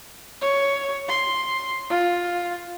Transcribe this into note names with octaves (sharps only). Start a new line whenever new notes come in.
C#5
C6
F4